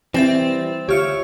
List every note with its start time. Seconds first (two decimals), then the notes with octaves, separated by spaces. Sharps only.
0.14 E3 G3 C4 E5 A6 E7
0.89 D2 F4 G4 C#5 E5 F6 C#7